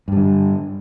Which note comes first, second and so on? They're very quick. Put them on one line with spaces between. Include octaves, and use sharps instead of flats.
G2 G3 D3